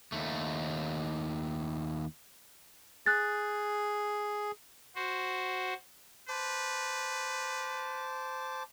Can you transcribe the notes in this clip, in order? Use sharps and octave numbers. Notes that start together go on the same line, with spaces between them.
D#2 A3
G#4 F#6 A6
F#4 C5
B4 C5 A5 D6